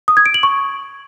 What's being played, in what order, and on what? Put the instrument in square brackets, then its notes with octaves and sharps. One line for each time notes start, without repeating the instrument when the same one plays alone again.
[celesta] D#6
G#6
D7
F#7
C#6